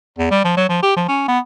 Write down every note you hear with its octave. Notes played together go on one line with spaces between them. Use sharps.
E2
G3
F3
F#3
F3
G4
F3
C#4
B3